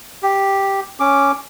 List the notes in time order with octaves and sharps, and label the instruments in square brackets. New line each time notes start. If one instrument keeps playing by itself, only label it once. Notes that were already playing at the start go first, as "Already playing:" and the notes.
[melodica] G4
C#4 D6